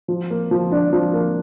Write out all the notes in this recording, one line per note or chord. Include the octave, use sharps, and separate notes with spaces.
F3
A#3
F3
D4
F3
A#3